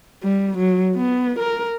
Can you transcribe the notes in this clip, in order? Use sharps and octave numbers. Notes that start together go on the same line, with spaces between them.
G3
F#3
B3
A#4